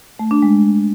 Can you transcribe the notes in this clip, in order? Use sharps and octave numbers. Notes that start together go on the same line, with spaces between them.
A3
D4
G#3